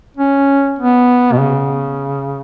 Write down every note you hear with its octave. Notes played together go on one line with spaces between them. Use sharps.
C#4
B3
B2
C#3